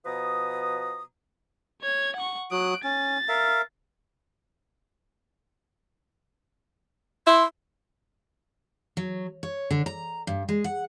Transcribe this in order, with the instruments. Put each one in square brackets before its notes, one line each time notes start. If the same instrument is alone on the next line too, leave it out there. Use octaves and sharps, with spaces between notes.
[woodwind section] B2 F3 B4 A#5 D#6
[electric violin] C#5 G#6
F#5 C#6
[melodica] F#3 D#6 [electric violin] F#6 D7
[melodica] C#4 [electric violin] A6
[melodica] A#4 E5 F5
[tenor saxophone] E4 [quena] C6
[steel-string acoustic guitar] F#3
C#5
D3
A#5
G2
G#3
F#5